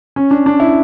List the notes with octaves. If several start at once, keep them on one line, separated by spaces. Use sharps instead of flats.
C#4
D4
D4
E4